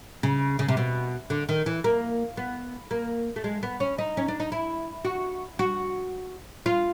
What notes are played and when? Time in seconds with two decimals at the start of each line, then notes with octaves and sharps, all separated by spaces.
0.23 C#3
0.59 C#3
0.68 C3
0.77 B2
1.30 D3
1.49 D#3
1.66 E3
1.84 A#3
2.37 B3
2.91 A#3
3.36 A3
3.44 G#3
3.63 B3
3.80 C#4
3.98 D#4
4.17 C#4
4.28 D4
4.40 D#4
4.52 E4
5.05 F#4
5.59 F#4
6.66 F4